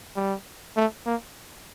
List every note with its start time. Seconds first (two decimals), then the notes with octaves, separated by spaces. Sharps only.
0.16 G3
0.77 A3
1.06 A#3